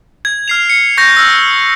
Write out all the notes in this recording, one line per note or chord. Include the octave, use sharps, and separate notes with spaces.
G#6
F6 C7 F7
C#7
C#6 G6 A#6
E6 F6